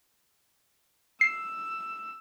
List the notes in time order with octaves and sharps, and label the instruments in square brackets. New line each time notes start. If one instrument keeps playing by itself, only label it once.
[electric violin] E6 [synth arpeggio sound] C7